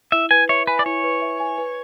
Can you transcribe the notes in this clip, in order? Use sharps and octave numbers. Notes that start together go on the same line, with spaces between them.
E4 E5
B4 G#5
C#5 E5
B4 G#5
D5
E4 C#5
B4
E5
G#5
B4